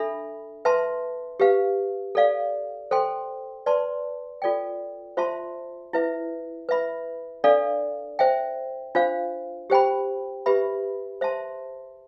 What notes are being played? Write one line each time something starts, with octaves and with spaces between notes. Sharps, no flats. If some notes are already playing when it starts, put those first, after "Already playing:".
Already playing: D4 A4 E5 B5
B4 E5 A5 C6
G4 B4 F5
A4 D5 F5
A4 C5 G5 C6
B4 D5 A5 C6
F4 A4 D5 G5
F4 C5 E5 A5 C6
E4 B4 E5
B4 E5 B5
D4 A4 D5 F5
C5 E5 G5
D4 F4 C5 F5
G4 C5 G5 B5
G4 B4 E5 B5
C5 E5 A5 C6